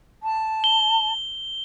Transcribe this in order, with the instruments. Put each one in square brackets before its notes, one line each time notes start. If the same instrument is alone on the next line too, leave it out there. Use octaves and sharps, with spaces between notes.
[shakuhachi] A5
[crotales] G7